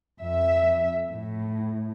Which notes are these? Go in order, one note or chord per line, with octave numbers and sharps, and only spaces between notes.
F2 E5
A2